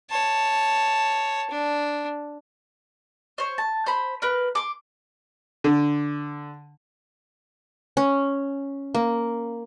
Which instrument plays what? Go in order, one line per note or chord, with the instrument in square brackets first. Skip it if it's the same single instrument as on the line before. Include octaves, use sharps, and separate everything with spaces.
[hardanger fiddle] C#5 A5
D4
[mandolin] C5 C#5
A5
C5 B5
A#4 B4
C6 D6
[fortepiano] D3
[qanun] C#4
A#3